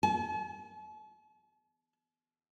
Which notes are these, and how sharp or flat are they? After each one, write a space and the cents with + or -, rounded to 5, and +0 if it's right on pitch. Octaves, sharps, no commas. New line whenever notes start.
A5 -45